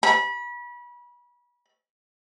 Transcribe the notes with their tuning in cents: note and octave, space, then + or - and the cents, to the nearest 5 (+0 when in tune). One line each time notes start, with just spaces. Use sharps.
B5 -30